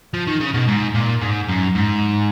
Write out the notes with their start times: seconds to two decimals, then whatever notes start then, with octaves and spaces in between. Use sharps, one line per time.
0.14 F3
0.27 D#3
0.40 C#3
0.54 B2
0.68 G#2
0.95 A#2
1.22 G#2
1.48 F#2
1.75 G#2